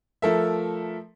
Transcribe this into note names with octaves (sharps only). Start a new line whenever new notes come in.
F3 A3 A4 A#4 E5